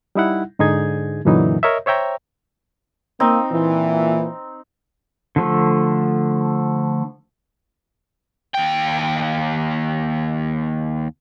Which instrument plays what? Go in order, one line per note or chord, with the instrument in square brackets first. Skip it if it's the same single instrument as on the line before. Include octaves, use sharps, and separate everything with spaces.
[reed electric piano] G3 D#4 E4 F#5
G#2 D3 D#4 G#4 G#6
F#2 A#2 D3 E3 F#3 D#4
A#4 C#5 D#5 E5
C5 C#5 E5 G5 A#5
[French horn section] A#3 [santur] C4 D#4
[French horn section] A#2 E3
[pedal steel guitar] D3 F3 A3
[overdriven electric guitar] D#2 G5